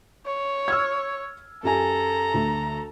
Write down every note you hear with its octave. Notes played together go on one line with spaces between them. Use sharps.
C#5
E6 F6 G#6
F#2 G4 A4 G#5 A#5
D2 A3